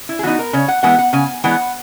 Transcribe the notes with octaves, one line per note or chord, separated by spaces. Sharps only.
E4
G#4
E3 B3 D#4 F#4
A#4
C#3 C#5
F#5
E3 G#3 B3 F#5
F#5
C#3 G#5
E3 G#3 B3 F#5